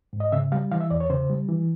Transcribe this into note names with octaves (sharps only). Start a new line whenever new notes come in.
G#2
D#5
C#3 E5
G3 F5
E3 F5
E5
E2 D5
C#5
C#3 C5
G3
E3